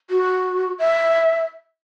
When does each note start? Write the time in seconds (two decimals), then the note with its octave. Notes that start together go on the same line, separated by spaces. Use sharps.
0.10 F#4
0.79 E5